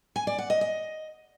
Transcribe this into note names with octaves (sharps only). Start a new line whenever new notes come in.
G#5
D5
F#5
D#5
D#5